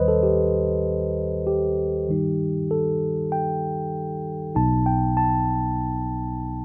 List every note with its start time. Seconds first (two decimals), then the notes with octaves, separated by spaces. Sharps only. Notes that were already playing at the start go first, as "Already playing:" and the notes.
Already playing: D#2 D#3 G3 B4 C5 D#5
0.08 A4
0.23 G4
1.47 G4
2.09 G2 D#3 G3 D#4
2.71 A4
3.32 G5
4.55 B1 B2 F#3 B3 D#4 A5
4.86 G5
5.17 A5